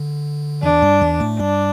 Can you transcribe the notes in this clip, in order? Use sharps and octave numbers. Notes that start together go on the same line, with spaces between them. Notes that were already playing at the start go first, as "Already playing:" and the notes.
Already playing: D3
E2 E3 D4
G2 G3
E2 E3
A2 A3
G2 G3 D4